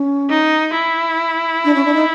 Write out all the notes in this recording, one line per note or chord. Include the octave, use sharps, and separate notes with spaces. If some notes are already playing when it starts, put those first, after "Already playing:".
Already playing: C#4
D#4
E4
D4
C#4
D4
D#4